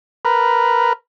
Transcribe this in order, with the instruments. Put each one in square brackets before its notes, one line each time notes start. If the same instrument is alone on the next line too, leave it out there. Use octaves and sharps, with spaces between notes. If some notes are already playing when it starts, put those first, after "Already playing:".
[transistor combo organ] A#4 B4